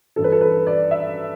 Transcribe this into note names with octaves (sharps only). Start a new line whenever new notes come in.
G2 E3 A4
B4
A4
B4
D5
E5